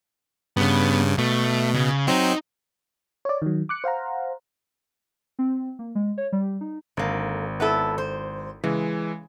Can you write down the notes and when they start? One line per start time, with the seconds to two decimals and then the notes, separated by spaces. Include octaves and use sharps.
0.57 G2 C#3 B3
1.18 B2 A3
1.75 C#3
2.07 F#3 C4 D#4
3.25 C#5 D5
3.42 D#3 F#3
3.69 D6 F#6 C#7
3.84 C5 F5 F#5 A#5
5.39 C4
5.79 A#3
5.95 G#3
6.18 C#5
6.32 G3
6.61 D#4
6.97 G#1 D3 A#3
7.60 B3 E4 A4
7.98 C5
8.64 C#3 E3 G#3